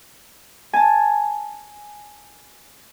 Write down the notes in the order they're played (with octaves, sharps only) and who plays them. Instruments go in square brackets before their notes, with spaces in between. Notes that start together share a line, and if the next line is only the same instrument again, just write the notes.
[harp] G#5 A5